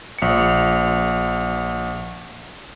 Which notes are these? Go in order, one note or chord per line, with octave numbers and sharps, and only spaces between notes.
A#1 C#7